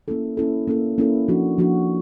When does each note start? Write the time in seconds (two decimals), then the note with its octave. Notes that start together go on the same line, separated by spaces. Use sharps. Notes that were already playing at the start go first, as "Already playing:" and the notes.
0.08 A#3 C#4 E4 A4
0.37 A#3 C#4 E4 A4
0.67 A#3 C#4 E4 A4
0.98 A#3 C#4 E4 A4
1.28 F3 A#3 D4 F#4
1.58 F3 A#3 D4 F#4